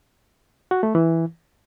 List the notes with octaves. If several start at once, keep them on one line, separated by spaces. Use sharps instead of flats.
F#4
A3
E3